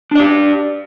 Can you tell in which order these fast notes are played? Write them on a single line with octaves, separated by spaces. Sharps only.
D4 D5 G4